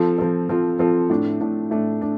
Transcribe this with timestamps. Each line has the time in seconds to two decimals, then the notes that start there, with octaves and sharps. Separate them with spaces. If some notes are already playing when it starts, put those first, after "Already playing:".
Already playing: F3 C4 F4 A4
0.18 F3 C4 F4 A4
0.49 F3 C4 F4 A4
0.79 F3 C4 F4 A4
1.10 A2 A3 D4
1.41 A2 A3 D4
1.71 A2 A3 D4
2.01 A3 D4